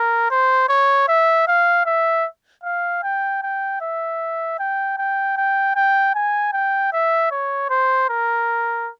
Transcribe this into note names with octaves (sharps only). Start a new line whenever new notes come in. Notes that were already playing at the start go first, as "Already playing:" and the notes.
Already playing: A#4
C5
C#5
E5
F5
E5
F5
G5
G5
E5
G5
G5
G5
G5
G#5
G5
E5
C#5
C5
A#4